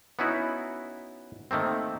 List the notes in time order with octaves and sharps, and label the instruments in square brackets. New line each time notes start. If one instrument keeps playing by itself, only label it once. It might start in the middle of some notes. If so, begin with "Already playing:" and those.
[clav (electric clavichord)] B3 C#4 D#4 E4 F#4
D#3 A3 A#3 C4